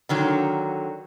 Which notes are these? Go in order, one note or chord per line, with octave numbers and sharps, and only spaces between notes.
D3 D#3 F#3